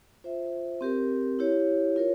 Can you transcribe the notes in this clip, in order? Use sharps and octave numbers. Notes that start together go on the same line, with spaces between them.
F4 C5 E5
C4 G4 A#4
E4 G4 C#5
F4 A#4 C#5